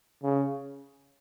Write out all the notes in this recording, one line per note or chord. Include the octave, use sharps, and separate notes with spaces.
C#3